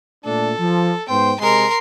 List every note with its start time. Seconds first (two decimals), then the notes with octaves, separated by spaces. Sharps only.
0.25 A#2 A3 D4 A4
0.59 F3
1.09 G#2 B3 C5 G5
1.40 C3 G#3 A#4 C6